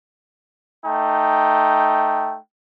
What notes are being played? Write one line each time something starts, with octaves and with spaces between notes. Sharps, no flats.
A3 D#4 G5